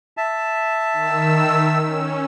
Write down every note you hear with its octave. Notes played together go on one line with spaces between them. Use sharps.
E5 A5
D#3 E6
C#4